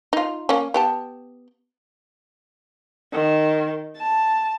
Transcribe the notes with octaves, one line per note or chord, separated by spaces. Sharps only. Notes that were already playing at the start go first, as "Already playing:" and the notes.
D#4 F4
A#3 C#4
B3 G4 A5
D#3
A5